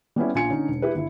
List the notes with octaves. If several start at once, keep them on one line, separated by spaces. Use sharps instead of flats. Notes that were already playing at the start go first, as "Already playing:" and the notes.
G3 B3 C#4 E4
A#1 F4 G#5 C#7
D3 C#4 D#4
E1
E4 G4 B4
G1 E4